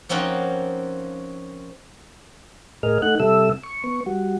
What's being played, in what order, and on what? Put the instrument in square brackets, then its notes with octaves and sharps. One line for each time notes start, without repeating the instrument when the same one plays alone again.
[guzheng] F3 A#3 C4 C#4 D#4 F#4
[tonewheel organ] A2 G#4 A#4 D#5 F6
A3 D#4 F#5 F#6
C3 G3 A4 E5 E6
C#6
B3 C#6
G3 F#4